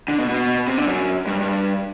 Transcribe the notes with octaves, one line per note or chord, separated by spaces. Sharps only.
D3
B2
B2
C3
D3
F#2
G2
G2